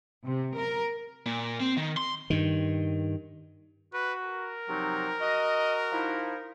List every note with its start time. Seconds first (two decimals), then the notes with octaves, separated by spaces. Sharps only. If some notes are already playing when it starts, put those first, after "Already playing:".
0.25 C3
0.55 A#4
1.26 A#2
1.60 C4
1.77 D#3
1.97 C6
2.30 G2 D#3
3.94 F#4 B4
4.24 A#4
4.69 C3 F3 F#3 D#4
5.21 F#4 D#5
5.92 F3 D#4 E4